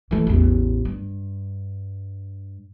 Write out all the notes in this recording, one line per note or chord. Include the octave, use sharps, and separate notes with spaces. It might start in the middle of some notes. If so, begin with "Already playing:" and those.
E3 A3
A1 E2
G2